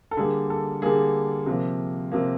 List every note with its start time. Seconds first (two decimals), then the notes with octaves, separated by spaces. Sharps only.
0.11 A4
0.17 D3 G3 A#3 G#4
0.50 A4
0.82 D3 G3 A#3 G#4
1.46 C3 F3 A#3
2.11 C3 F3 A#3